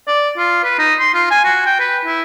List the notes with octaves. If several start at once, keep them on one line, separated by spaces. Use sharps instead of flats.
D5
F4
B4
D#4
C6
F4
G#5
F#4
G5
B4
E4